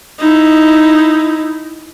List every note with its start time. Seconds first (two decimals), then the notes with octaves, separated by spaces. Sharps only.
0.19 D#4 E4